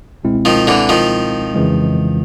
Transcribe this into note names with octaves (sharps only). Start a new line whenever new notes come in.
C#2 B2 G#3 C4 E4
D#3 F3
D3 E3
D#3 F3
F2 C#3 E3 G#3